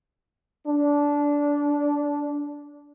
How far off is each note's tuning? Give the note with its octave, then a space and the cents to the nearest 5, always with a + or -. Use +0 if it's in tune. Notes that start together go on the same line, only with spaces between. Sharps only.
D4 -15